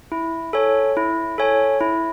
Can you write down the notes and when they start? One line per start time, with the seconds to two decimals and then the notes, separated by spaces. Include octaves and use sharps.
0.12 E4
0.53 A4 C#5 G#5
0.97 E4
1.38 A4 C#5 G#5
1.81 E4